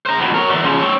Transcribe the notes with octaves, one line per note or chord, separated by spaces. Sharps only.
C5 A#5
F2 B2
A#4 C#5
E2 D3
C#3 F3
C4 C#5